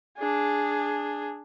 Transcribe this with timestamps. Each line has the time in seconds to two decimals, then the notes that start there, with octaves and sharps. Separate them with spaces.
0.18 D4 G#4